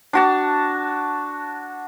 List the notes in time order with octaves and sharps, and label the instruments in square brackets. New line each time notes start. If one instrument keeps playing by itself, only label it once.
[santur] D4 F#4 A5